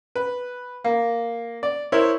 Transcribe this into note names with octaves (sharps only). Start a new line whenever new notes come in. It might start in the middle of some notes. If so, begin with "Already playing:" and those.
B4
A#3
D5
E4 A#4 C5 C#5